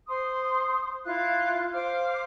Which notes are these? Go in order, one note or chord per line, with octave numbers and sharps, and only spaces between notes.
C5 C6 D#6
E4 F4 F5 F#6
C5 F5 D6 F6